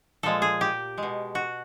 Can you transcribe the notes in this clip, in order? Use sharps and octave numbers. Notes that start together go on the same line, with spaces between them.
A#2 F3 G#3 A4
G#4
G4
G#3
B2
F#4